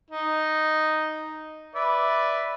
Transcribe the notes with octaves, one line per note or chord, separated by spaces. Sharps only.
D#4
B4 D5 E5